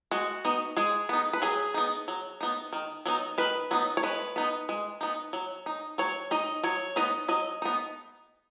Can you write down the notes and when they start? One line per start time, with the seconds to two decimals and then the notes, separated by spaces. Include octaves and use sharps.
0.11 G#3 F#4
0.45 B3 D#4
0.77 G#3 G#4
1.09 B3 D#4
1.33 B4
1.42 F#3 G#4
1.74 B3 D#4
2.08 F#3
2.41 B3 D#4
2.73 D#3
3.06 F#3 B3 D#4
3.38 D#3 B4
3.71 F#3 B3 D#4
3.97 C#5
4.03 G#3 B4
4.36 B3 D#4
4.69 G#3
5.01 B3 D#4
5.33 F#3
5.66 D#4
5.98 F#3 C#5
6.31 D#4 D#5
6.63 F#3 C#5
6.96 B3 D#4 D#5
7.28 F#3 D#5
7.62 B3 D#4